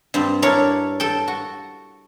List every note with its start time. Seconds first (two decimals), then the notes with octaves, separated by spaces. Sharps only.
0.14 G2 C4
0.42 D4 E4 A#4 C#5
1.00 A4 G5
1.28 F#4